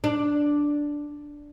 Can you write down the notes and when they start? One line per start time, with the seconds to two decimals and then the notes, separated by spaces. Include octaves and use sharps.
0.04 D4